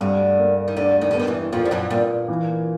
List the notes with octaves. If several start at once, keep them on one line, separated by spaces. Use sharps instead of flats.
D2 G2 D3
A#3
D#3
D2 D3 D4
D#2 D#3
D3
D#3 B3
E2 E3
F2 A#2 F3
G3
F#2 F#3
G2 A#2 G3
E3